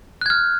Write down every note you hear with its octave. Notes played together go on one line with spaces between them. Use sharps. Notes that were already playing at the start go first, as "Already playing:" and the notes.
F6 F#6 G#6